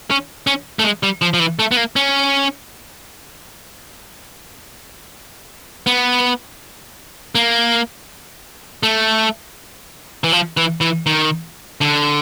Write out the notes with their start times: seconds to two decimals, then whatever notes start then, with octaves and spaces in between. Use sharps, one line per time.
0.10 C#4
0.47 C#4
0.79 A3
0.84 G#3
1.03 G3
1.22 F3
1.34 F3
1.40 E3
1.59 A3
1.72 B3
1.77 A#3
1.96 C#4
5.87 B3
7.35 A#3
8.83 A3
10.24 E3
10.32 F3
10.57 E3
10.81 E3
11.06 D#3
11.81 D3